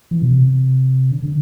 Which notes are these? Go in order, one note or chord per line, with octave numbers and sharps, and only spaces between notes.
E3
B2
C3
D3
D3